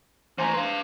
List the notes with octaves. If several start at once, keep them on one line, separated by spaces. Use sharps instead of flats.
E3 A3 C5 G#5 A#5
B4 F5 C6